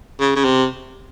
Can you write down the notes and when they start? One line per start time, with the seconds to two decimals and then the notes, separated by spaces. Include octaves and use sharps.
0.20 C#3
0.36 C#3
0.45 C3